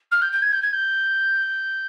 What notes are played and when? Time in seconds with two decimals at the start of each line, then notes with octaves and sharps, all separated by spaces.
0.11 F6
0.21 G6
0.32 G6
0.42 G#6
0.52 G6
0.62 G#6
0.72 G6